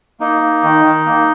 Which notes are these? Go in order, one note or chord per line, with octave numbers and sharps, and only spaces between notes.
A#3 D#4
A#3
D#3
D#3
A#3